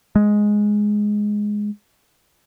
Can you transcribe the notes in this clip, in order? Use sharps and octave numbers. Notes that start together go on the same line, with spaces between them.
G#3